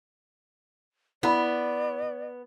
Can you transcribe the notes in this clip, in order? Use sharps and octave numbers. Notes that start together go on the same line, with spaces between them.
B3 E4 D5 B5